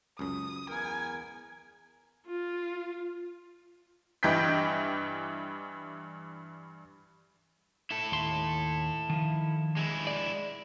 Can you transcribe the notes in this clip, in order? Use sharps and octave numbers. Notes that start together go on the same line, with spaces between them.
C#2 F#2 D#6
E2 A#4 G#5
F4
G2 E3 D#5 G5 G6 B6
E4 A4
D#2 C6
D#3 F3
G#3 E4
D5